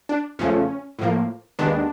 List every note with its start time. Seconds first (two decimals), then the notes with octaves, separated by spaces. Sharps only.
0.09 D4
0.39 E2 C#3 F3 A3 C#4
0.99 A2 F3 A#3
1.59 D#2 D#3 G#3 B3 D4